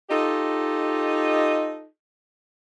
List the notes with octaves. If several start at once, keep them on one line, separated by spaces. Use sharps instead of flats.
D#4 F4 G4 A4 D#5